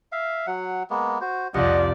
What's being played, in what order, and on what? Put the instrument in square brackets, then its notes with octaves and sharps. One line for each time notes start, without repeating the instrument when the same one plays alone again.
[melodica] E5 F5
F#3 F#5
G#3 A#3 B3
F#4 C5
[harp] C2 F2 [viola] F3 D5 [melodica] D#5 F#5